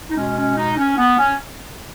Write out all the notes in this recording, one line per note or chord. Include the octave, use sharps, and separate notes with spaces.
D#4
B2 G#3 C#4
C#4
D#4
C#4
B3
C#4